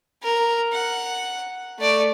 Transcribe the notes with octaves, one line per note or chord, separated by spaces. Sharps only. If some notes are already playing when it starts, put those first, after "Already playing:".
A#4
F#5
A3 D5